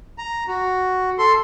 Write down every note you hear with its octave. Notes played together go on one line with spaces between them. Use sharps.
A#5
F#4
A4 C6